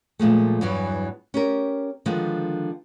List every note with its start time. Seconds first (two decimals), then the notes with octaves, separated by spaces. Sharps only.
0.19 A#2 F3 G#3 A3
0.61 E2 G2 E3 F#3
1.34 C#4 G4 A#4
2.06 D3 D#3 F3 G#3 B3 D4